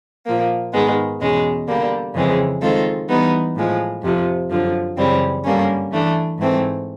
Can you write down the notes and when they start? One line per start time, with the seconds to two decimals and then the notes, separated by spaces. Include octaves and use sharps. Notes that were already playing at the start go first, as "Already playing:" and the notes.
0.26 A#2 F3 A#3
0.73 G#2 D#3 G#3 B3
1.20 E2 B2 G#3 C#4
1.67 D3 G3 A#3
2.14 F2 C#3 E3 G#3 C4
2.61 D#3 G#3 C4 F4 A4
3.09 E3 G3 B3 D#4
3.56 A2 F3 G#3
4.03 F2 C3 F3
4.50 F#2 D3 F3
4.97 F#2 C#3 E3 G3 C4
5.44 G2 D3 G3 A#3 C#4
5.92 E3 A3 D4
6.38 G#2 E3 A3 C4